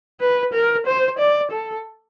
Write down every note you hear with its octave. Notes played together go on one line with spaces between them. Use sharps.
B4
A#4
C5
D5
A4